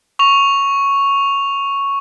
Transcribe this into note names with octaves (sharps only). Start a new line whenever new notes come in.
C#6 F7